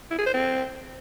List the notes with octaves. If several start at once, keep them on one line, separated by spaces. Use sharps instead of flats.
E4
G#4
C5
C4